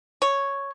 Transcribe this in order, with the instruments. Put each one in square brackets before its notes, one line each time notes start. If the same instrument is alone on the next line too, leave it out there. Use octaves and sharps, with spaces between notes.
[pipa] C#5